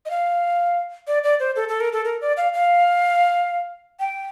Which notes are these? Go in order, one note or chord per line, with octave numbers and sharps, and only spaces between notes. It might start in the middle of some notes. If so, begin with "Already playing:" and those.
D#5
F5
D5
D5
C5
A4
A4
A#4
A4
A#4
D5
F5
F5
G5